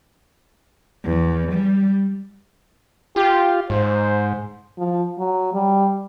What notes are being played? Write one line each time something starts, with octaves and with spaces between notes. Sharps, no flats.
E2
G3
F4 G4
G#2 C5
F3
F#3
G3